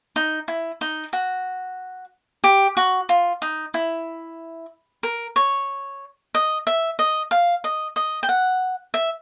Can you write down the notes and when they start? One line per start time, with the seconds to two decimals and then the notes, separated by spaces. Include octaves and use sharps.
0.16 D#4
0.48 E4
0.81 D#4
1.13 F#4
2.44 G4
2.77 F#4
3.09 F4
3.42 D#4
3.74 E4
5.03 A#4
5.36 C#5
6.35 D#5
6.67 E5
6.99 D#5
7.31 F5
7.64 D#5
7.96 D#5
8.23 G5
8.29 F#5
8.94 E5